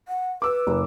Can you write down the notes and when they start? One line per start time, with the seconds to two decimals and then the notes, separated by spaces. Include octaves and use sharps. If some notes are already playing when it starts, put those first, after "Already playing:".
0.08 F#5
0.42 B4 D6 E6
0.67 F#1